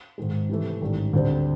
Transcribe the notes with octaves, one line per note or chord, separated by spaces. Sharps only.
G#2 D#3 G#3
C3 E3 A3
A1 G#2 D#3 G3
D2 D3 G3 C4